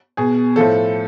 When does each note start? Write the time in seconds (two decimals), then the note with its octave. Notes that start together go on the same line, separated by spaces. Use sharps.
0.17 B2 G#4
0.56 A2 F3 A4